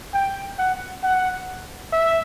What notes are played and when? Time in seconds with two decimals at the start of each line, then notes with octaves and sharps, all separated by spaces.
0.14 G5
0.59 F#5
1.03 F#5
1.93 E5